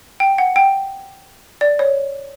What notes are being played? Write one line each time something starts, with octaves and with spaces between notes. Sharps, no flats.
G5
F#5
G5
D5
C#5